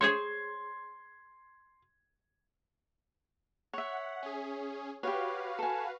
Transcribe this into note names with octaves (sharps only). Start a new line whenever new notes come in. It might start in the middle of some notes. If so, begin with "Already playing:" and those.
G#4 C5 C#5 C6 G#6
C#5 E5 F#5
C#4 G#4
F#4 G4 B4 C#5 F5
A4 G#5